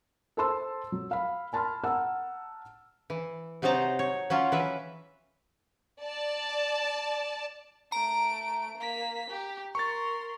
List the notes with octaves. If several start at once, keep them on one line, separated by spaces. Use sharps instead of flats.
A4 C5 A5 C6 E6
F#3
F5 B5
G#5 A5 B5 C6 F6
F#5 A5 A#5 E6 F6
E3
C3 F#3 D#4 C5 A5 A#5
C#5
F#3 C#4 F4
E3 B4 E5
D5 A5
A3 A#5 D7
A#3 B6
G4
A#4 C6 C#6 A6